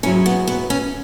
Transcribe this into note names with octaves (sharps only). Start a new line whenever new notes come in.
G#2 F#3 C#4 E4
B3
B3
C#4